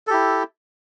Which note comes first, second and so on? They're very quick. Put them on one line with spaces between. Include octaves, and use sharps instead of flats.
A4 G4 E4